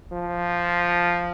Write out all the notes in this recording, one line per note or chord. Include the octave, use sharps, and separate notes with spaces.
F3